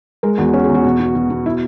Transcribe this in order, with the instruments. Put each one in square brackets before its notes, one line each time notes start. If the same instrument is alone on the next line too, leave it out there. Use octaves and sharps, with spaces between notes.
[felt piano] G#3 A#4
E2 F#4
C#4 F#4
G#4
E2
F#4
B2
B2
B2
B2
E4